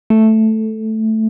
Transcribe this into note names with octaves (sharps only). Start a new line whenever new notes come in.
A3